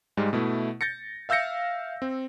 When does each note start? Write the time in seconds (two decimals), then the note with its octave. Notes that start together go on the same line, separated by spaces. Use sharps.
0.17 G#2 G3 G#3
0.33 B2 A3 E4
0.81 G6 A6 A#6 C#7
1.29 E5 F5 E6 G6 A#6 C#7
2.02 C4